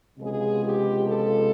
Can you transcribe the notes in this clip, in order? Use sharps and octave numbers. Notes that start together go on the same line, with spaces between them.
C#2 C3 F3 G#3 B3 G#4
G4
A4